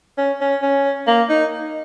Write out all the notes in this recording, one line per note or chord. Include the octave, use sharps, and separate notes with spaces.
C#4
C#4
C#4
A#3
D#4